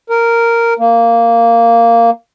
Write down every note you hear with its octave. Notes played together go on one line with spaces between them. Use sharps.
A#4
A#3